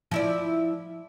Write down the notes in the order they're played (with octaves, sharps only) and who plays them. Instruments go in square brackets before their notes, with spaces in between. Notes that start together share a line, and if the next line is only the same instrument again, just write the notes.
[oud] F3 E4 D5